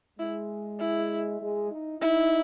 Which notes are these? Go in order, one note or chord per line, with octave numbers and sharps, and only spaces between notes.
G#3 E4
E4
G#3
D#4
D#4 E4